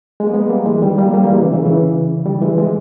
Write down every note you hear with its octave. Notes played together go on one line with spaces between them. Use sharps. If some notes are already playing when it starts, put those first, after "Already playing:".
G#3
A#3
G#3 B3
G3 A#3
E3 G#3
D#3 G3
G3 A#3
G3 A#3
A#3
E3 G#3
C#3 E3
C#3 E3
C#3 E3
D#3 G3
E3 G#3
E3 G#3